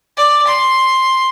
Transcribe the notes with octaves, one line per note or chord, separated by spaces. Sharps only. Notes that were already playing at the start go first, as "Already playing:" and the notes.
D5
C6